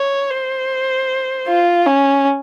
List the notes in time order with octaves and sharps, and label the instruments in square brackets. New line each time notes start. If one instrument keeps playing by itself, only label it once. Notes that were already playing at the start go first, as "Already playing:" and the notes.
Already playing: [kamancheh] C#5
C5
F4
C#4